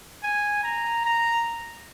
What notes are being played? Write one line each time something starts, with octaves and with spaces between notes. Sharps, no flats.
G#5
A#5
A#5